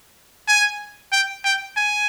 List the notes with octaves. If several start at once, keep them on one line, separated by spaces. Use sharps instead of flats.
G#5
G5
G5
G#5